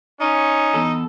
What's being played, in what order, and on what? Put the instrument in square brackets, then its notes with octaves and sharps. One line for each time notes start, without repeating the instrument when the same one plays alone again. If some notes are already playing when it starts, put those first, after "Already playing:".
[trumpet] C#4 [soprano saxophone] D#4
[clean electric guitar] E2 A4